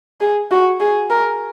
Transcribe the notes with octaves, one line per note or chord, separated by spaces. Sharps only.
G#4
F#4
G#4
A#4